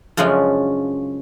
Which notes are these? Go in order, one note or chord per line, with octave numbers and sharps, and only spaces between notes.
F#2 C#3 F3 G#3 C#4 D4